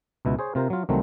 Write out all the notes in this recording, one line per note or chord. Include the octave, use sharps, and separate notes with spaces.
C#2 B2 E4
G#4 C5 C#5
C3 F4 A#4 C5
F#3 F4
C2 D#3 F#3 A3 C4